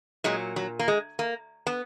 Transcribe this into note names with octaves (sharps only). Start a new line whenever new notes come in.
A#2 F#3 G#3
F#3
A#3
G#3
A#3
B3